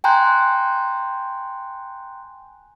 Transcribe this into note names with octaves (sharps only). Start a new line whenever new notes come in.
G5 G#5 A#5 C6 F#6 G6